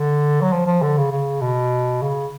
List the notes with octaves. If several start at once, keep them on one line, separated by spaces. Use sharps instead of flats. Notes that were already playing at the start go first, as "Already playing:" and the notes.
Already playing: D3
F#3
F3
F3
D3
C#3
C#3
B2
C#3